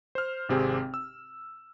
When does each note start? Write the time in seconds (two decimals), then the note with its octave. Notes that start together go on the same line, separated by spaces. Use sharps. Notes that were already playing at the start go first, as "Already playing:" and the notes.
0.15 C5 F6
0.49 G#1 C3 C4 G4 G#4 G5
0.94 E6